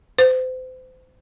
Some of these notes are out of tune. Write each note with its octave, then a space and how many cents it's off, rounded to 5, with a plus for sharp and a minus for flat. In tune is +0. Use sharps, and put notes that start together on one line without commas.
C5 -35